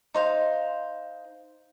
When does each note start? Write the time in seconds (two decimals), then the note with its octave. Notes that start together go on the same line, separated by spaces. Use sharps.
0.14 D#4 C5 F5